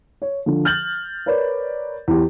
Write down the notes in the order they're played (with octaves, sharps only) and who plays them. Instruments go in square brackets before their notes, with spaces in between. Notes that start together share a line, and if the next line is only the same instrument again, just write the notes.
[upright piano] C#5
D3 F3
F6 G6 A6 F#7
A#4 B4 C#5 D5
E2 G4